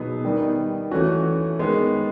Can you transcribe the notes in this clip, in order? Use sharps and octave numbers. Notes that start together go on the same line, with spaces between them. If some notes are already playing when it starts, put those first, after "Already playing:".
Already playing: B2 F#3 B3 D#4 G#4
D#3 G3 B3 D#4
E3 A3 C#4 F#4
D#3 G#3 B3